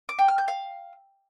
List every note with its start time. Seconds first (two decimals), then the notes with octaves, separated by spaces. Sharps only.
0.09 D6
0.19 G5
0.28 F6
0.38 G6
0.48 F5